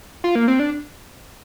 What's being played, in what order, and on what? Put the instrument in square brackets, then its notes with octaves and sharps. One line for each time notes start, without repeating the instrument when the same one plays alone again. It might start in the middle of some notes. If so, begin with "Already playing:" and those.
[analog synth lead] F4
A#3
C4
D4